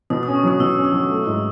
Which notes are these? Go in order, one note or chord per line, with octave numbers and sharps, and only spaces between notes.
B2 D#6
C#4 D#6
C#6
F#3 D#6
B2 E6
C#4
D#6
F#3
A3
G#2